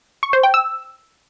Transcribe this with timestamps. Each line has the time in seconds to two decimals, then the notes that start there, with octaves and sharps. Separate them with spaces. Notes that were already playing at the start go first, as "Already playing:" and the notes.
0.23 C#6
0.33 C5
0.43 G5
0.54 E6